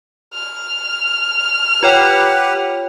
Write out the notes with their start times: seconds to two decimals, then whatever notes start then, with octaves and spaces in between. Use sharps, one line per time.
0.34 F6
1.83 F4 G4 B4 C#5 F#5 G5